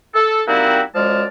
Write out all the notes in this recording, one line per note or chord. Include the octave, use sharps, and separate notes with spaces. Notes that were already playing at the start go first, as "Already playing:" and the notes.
A4
G3 A#3 C4 D#4 E4 F#4
F#2 F3 G#3 D5 A5 F6